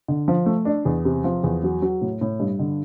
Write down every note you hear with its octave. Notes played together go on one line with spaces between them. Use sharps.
D3
F3
A3
D4
E2
C3
F3
E2
F#3
F#3
A2
A2
G2
D3